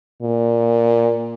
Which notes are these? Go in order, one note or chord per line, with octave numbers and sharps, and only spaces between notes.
A#2